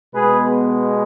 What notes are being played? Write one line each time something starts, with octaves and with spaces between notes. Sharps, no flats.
B2 G#3 B3 G#4 B4